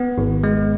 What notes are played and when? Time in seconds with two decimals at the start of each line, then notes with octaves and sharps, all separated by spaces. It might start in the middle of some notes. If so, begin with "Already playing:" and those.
Already playing: B3
0.18 G#1
0.44 G#3